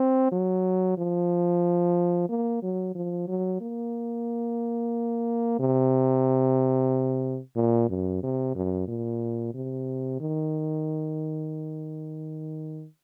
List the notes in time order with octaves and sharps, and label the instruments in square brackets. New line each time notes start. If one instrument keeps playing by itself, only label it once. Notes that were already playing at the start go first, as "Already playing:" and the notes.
Already playing: [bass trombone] C4
F#3
F3
A#3
F#3
F3
F#3
A#3
C3
A#2
F#2
C3
F#2
A#2
C3
D#3